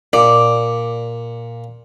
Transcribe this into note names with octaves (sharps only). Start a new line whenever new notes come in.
A#2 D5